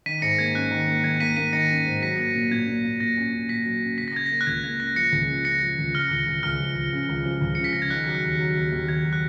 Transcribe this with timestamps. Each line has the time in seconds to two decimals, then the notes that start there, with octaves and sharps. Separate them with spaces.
0.06 D#3 B6 D#7
0.22 G#2 A#6 C#7
0.38 A#3 G#6
0.55 C#4 F#6
0.71 D#3
0.87 A#3
1.04 D#3 G#6
1.20 A#3 B6 D#7
1.36 A#3 B6 D#7
1.53 D#3 A#6 C#7
1.69 C#4
1.86 G#2
2.02 F#3 B6
2.18 A#3
2.35 A#2
2.51 A#2 G#6
2.67 A#2
2.84 A#3
3.00 A#2 A#6
3.17 C#4
3.33 C#4
3.49 A#2 B6
3.65 F#3
3.82 C#4
3.98 C#3 B6
4.08 A#6
4.14 C#3 G#6
4.26 A#6
4.31 A#3
4.41 F#6
4.47 C#2 G#6
4.64 A#3 G#6
4.80 C#3 A#6
4.96 F3 A#6 C#7
5.12 C#2
5.29 C#3
5.45 C#3 A#6 C#7
5.62 F3
5.78 C#2
5.95 C#3 F6
6.11 C#2
6.27 C#2
6.43 C#2 F6
6.60 F3
6.76 C#2
6.93 C#3
7.09 C#2
7.26 F3
7.41 C#2
7.55 C#3 C#7
7.64 B6
7.73 C#3 A#6
7.82 G#6
7.90 D#3 F#6
8.07 F#3
8.15 F#6
8.23 D#2
8.40 F#3
8.56 D#2
8.72 D#2
8.89 D#2 G#6
9.04 F#3
9.13 F#6